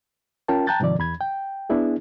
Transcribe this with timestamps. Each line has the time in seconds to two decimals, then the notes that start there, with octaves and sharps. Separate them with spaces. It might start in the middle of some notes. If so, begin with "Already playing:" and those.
0.48 C#4 F4 A#4 G5 A5
0.67 G5 A5 A#5 F#6 G6 A6
0.80 G#2 C3 D#3 F3 D5
0.99 E2 B5 G#6
1.21 G5
1.70 B3 D4 E4 G#4